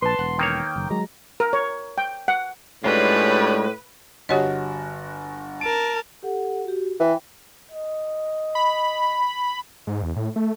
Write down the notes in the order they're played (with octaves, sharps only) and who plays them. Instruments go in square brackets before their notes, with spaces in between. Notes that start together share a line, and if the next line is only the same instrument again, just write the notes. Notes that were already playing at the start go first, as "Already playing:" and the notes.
[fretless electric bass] A#1 [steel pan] B4 A5 [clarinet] C6
[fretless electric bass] E1 [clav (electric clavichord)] F#5
[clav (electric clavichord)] D#3 A#3 C#5 [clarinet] G5
[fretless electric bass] F#1
[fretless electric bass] F#3 G#3 [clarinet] A#5
[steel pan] A#4
C#5
G5
F#5
[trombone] A2 [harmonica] G3 C#4 D4 [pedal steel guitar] G#3 F4 [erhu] B4
[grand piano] G1 F#4 [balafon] G4 C#5 D#5
[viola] A#4 A5 [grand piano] D7
[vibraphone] G4 A4 F#5
F#4 G4
[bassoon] E3 [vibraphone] G5
[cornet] D#5
[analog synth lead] B5
[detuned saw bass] G#2
E2
A2
A3